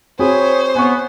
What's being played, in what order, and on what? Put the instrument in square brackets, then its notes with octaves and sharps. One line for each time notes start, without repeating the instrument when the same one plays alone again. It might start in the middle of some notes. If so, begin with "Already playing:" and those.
[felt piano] C4 F#4 G#4 [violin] C5 [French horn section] C#5 [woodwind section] G#5 B5 D#6
[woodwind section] B3 [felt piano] G#5 C#6